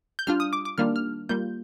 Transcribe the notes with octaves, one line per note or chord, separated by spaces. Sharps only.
G6
G3 D4 F4 F6
D#6
D6
D6
D#3 G3 A#3 D4 F4 F6
F6
G3 A#3 F4 G6